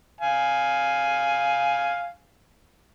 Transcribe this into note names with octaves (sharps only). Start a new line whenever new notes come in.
F5 G#5